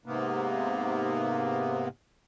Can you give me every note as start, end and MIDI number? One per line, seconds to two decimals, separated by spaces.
0.06 1.88 44
0.06 1.88 48
0.06 1.88 58
0.06 1.88 59